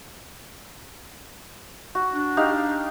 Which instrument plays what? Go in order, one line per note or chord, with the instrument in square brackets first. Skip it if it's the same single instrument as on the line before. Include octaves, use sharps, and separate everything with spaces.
[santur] F#4
[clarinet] D4
[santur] D#4 G4 F5